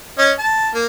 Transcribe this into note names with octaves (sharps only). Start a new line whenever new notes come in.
C#4 D#5
A5
A#3